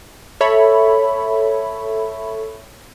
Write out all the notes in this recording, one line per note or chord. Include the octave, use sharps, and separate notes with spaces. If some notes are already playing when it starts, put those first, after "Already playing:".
A4 C#5 E5 B5